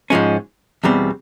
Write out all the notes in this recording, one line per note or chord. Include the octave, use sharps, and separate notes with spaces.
G#2 F3 G#3 C#4
E2 B2 G3 C4